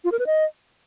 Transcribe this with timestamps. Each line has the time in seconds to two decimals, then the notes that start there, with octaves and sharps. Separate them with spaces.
0.04 F4
0.12 A#4
0.19 B4
0.26 D#5